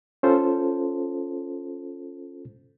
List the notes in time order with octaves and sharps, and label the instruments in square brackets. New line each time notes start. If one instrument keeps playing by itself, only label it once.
[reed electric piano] C#4 F4 A4 C5